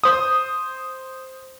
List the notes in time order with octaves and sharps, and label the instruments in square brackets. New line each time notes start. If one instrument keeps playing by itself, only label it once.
[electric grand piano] C5 D#6